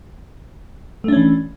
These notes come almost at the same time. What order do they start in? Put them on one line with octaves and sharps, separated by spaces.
A3 D4 C#4 E3